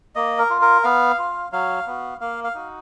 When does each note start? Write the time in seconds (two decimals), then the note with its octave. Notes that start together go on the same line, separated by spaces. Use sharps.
0.16 A#3 D#5
0.39 A#4
0.50 F4
0.62 A#4
0.83 B3 F5
1.19 F4
1.52 F#3 F5
1.87 B3 F#4
2.21 A#3 F5
2.44 F5
2.55 D#4 F#4